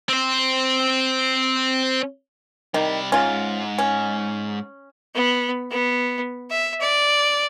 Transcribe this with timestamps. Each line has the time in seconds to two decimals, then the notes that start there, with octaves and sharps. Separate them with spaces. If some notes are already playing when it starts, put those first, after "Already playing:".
0.09 C4 C5
2.74 C3 D#3 G3
3.12 G#2 C#4 F4
3.78 C#4
5.15 B3
5.71 B3
6.51 E5
6.81 D5